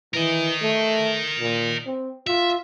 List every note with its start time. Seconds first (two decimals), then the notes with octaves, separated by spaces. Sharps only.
0.14 E3 A#4 D#5
0.62 A3
1.39 A#2
1.86 C4
2.27 F4 E5